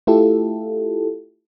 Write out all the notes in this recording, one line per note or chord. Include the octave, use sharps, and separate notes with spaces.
A3 E4 F4 G4 A4